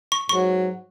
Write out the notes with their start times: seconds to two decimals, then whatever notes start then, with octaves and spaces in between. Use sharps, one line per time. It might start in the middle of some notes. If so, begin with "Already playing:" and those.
0.12 C#6
0.29 G#2 F#3 C#6